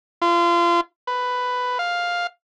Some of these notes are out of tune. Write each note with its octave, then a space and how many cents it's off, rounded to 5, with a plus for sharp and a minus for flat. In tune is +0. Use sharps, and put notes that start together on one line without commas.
F4 -30
B4 +10
F5 +5